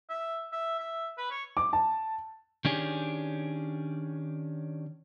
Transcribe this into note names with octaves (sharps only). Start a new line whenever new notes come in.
E5
E5
E5
B4
C#5
D6
A5
D#3 C#4 D4 G4 G#4